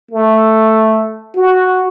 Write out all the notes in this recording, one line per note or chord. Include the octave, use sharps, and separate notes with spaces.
A3
F#4